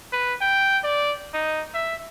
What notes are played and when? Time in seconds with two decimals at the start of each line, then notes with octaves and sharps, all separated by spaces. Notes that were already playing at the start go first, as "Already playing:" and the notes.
0.12 B4
0.41 G5
0.84 D5
1.33 D#4
1.74 E5